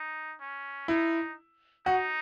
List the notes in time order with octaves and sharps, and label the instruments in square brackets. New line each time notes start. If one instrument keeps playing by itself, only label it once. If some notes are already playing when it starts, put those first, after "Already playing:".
Already playing: [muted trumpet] D#4
C#4
[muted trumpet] D#4 [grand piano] E4
[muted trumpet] D#4 [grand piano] F#4